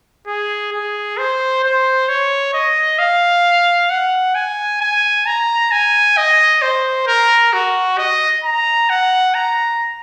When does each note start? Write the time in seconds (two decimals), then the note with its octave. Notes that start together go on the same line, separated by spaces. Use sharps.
0.27 G#4
0.73 G#4
1.18 C5
1.63 C5
2.09 C#5
2.54 D#5
2.99 F5
3.90 F#5
4.35 G#5
4.81 G#5
5.26 A#5
5.71 G#5
6.17 D#5
6.62 C5
7.07 A#4
7.53 F#4
7.98 D#5
8.44 A#5
8.89 F#5
9.34 A#5